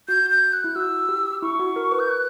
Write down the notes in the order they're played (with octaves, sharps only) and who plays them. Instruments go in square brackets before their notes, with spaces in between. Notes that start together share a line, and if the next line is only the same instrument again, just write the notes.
[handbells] F#4 [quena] G6
[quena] G6
F#6
[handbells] E4
[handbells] F#4 [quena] E6
[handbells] G4
[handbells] E4 [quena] C#6
[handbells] F#4
A#4
B4
[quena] G6
F#6